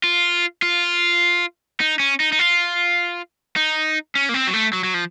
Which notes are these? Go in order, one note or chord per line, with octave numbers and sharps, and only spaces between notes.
F4
F4
D#4
C#4
D#4
D#4
F4
D#4
C#4
A#3
C4
F#3
A3
F#3
F#3
F3